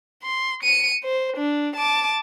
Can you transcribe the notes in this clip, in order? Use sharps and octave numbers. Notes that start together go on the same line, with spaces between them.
C6
C#7 D#7
C5
D4
A5 D6